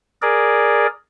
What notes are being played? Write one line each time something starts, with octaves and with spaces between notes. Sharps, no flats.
G#4 A#4 D5